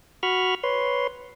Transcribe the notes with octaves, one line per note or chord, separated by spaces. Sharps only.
F#4 B5 C#6 F6
B4 C#5 C6